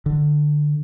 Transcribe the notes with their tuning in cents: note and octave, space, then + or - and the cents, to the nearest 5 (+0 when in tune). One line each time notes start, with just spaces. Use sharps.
D3 +15